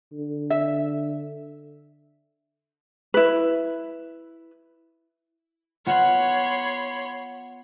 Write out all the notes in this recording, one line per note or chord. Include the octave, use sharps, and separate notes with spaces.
D3
E5
E4 B4
B3 F4 C#5 F#5 B5 C6